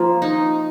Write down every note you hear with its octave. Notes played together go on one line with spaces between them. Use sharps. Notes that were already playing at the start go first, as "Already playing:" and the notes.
Already playing: F3 A#3 F4
D#4